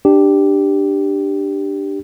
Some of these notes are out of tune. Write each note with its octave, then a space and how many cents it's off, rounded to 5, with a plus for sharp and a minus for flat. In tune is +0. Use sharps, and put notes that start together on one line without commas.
D4 +10 G4 +0